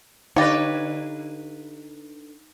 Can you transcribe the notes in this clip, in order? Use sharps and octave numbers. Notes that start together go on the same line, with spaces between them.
D3 D#4 G4 B4 C#5 F5 A6 A#6